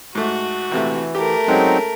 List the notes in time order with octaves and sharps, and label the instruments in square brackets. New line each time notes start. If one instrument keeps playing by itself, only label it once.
[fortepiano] G#2 A3 [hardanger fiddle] F#4
[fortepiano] A#1 C3 A3 [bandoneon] E3
[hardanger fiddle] A3 A#4 [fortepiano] G4
[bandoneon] F#3 C4 D#4 [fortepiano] G#3 C#4